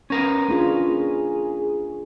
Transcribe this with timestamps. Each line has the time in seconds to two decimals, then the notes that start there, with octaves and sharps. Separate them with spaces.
0.10 C#4 A#4 B4
0.49 A#3 D4 F4 G#4